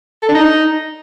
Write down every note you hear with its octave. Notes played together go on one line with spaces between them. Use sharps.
A4
D4
D#4